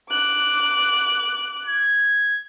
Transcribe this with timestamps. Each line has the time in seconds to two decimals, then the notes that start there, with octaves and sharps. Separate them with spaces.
0.11 D6 F#6
1.66 G#6